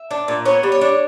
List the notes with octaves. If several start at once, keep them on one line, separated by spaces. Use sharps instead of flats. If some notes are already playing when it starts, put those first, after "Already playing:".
Already playing: E5
D4
A#2
B3 C#5
G3
C#5
D4